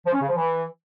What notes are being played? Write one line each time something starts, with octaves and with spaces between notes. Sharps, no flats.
F3
C#4
C#3
F3
E3